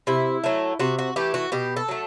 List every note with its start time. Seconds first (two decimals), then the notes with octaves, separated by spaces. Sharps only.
0.07 C3 E4
0.44 F#3 A3
0.79 C3 F#4
0.98 F#4
1.16 E3 A3 G4
1.34 F#4
1.52 B2 G4
1.76 A4
1.88 F#3 A3